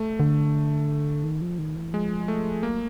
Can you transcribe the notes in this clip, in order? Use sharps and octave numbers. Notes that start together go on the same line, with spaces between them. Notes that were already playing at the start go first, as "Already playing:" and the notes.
Already playing: A3
D3
D#3
F3
D#3
E3
F3 G#3
A3
F#3 A#3